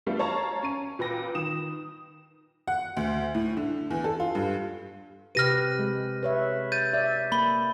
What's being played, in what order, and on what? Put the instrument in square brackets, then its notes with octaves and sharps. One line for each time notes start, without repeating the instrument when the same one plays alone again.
[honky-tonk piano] G3 A3 B3 D4 F4
C#5 F5 A5 A#5 C#6
C#4 D#7
A#2 B4 G5 A#6
D#3 D#6 E7
F#5
D2
A2
D3
E2
A4
F4
G2
[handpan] C3 G4 B4 [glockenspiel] F6 A#6 D#7
[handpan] G#3
B4 C#5 E5
[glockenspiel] G6 A6 D#7
[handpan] D5 E5
[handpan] A#3 [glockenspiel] B5 G7